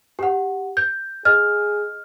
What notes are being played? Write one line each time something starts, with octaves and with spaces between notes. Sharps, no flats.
G4 F#5
G6
G#4 D#5 F6